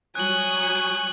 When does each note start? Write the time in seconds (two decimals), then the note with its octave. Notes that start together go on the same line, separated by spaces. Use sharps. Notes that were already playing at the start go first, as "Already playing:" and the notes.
0.15 F#3 G3 C#5 G#5 D#6 F#6 F#7